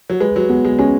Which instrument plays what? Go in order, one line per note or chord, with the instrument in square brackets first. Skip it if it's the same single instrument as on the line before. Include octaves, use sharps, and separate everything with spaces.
[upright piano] F#3
[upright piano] G#3 [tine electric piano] B4
[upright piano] F#3
[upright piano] G#3 [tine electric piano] B3
[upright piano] G#3
[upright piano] G#3 [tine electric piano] C#4